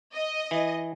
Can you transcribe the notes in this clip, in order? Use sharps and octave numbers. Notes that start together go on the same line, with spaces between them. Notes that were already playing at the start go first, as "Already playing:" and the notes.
D#5
E3